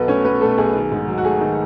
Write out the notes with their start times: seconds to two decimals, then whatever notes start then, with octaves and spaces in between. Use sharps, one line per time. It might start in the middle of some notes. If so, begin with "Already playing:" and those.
Already playing: B1 B2 B3 A4 B4
0.08 A3 C#4 C#5
0.25 B3 C#4 B4
0.41 B2 A3 A4
0.58 B1 G#4
0.74 D#3
0.91 G#2
1.08 F#3
1.18 F#4
1.24 A3 G#4
1.41 D#3